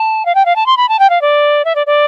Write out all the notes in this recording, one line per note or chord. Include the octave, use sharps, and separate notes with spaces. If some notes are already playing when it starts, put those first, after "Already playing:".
Already playing: A5
F5
G5
F5
A5
C6
B5
A5
G5
F5
D5
E5
D5
D5